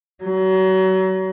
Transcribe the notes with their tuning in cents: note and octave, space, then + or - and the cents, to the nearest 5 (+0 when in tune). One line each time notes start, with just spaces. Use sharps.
F#3 +35